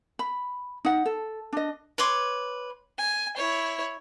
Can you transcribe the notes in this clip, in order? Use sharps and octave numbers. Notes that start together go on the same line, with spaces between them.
B5
D#4 F#5
A4
D4 D#5
B4 C#5 C6 D6
G#5
E4 C#5